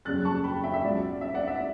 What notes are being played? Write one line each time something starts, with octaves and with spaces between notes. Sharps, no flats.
F#1 E2 C#3 G3 F#6 A6
A5 C#6
G5 B5
E5 G5
E5
C#2 B2 F#3 D5
E5
D5 F#5
E5